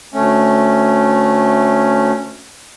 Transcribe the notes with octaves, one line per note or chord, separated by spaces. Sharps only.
D2 A3 C#4